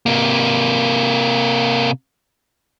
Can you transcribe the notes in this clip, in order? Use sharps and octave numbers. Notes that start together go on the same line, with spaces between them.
C3 A#3